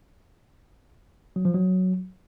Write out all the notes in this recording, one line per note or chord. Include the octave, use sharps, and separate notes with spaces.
F#3
F3
F#3